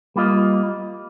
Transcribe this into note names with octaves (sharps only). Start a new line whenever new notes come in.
G3 A#3 F4 D#5